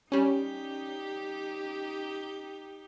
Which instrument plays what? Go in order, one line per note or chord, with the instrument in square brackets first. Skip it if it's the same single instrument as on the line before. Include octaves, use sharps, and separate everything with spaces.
[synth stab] G3 C#4 [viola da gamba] D#4 G4